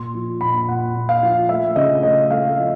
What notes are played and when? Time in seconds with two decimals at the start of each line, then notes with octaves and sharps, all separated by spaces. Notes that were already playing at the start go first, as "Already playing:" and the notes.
Already playing: A#2 C6
0.14 F3
0.41 A#2 B5
0.68 A#2 F#5
0.95 A#2
1.09 F5
1.23 F3
1.49 A3 E5
1.76 C#3 D#5
2.03 A3 D#5
2.31 A3 F5
2.58 F3